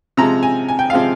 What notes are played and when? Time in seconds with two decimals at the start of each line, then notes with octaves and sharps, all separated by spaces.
0.17 C3 F3 G#3 A#5
0.43 G#5
0.68 G#5
0.79 G5
0.90 C3 F3 G#3 F5